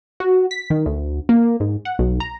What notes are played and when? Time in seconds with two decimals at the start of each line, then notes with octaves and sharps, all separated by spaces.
0.20 F#4
0.51 B6
0.70 D#3
0.86 D2
1.29 A#3
1.60 G#2
1.85 F#5
1.99 B1
2.20 A#5